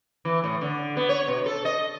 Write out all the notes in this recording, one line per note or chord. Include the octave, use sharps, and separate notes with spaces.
E3
A2
D3
B3
C#5
B2
A4
D#5